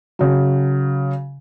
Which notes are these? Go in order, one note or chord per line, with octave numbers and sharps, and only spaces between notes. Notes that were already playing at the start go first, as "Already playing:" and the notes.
C#3 F#3